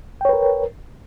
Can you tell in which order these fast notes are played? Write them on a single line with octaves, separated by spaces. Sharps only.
G5 C#5 B4 A#4